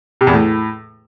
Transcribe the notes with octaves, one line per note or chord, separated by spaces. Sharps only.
C3
E2
A2